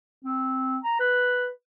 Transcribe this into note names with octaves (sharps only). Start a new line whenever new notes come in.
C4
A#5
B4